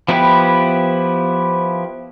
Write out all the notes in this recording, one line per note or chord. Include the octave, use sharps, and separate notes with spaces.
F3 B3 E4 G4 B4